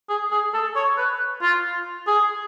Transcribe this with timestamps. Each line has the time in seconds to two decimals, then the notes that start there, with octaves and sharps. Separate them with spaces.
0.09 G#4
0.31 G#4
0.54 A4
0.76 C#5
0.97 B4
1.42 F4
2.07 G#4